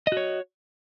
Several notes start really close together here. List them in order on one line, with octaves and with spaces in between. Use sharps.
D#5 F#4 C#5